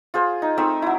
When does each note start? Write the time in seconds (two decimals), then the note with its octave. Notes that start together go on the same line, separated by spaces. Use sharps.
0.14 F4 G#4 C5
0.42 D#4
0.58 A3 C4 D#4 E5
0.82 F#3 E4